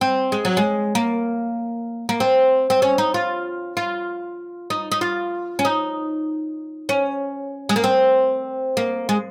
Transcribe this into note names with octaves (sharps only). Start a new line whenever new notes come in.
C4
G#3
F#3
G#3
A#3
A#3
C4
C4
C#4
D#4
F4
F4
D#4
D#4
F4
C#4
D#4
C#4
G#3
A#3
C4
A#3
G#3